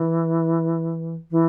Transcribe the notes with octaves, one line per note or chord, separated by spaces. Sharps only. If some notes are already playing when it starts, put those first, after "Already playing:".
Already playing: E3
E3